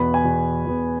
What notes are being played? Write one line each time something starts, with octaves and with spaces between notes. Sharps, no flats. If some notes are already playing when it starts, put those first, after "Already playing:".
Already playing: E2 B2 B3 B5
G#5
E2 B2 B3
E2 B2 B3